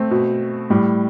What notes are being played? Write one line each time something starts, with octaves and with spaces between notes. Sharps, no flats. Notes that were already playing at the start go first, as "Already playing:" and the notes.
Already playing: A3 C4
B2
A2 G3